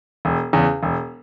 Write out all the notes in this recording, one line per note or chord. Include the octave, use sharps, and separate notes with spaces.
E1
E2 C#3
E1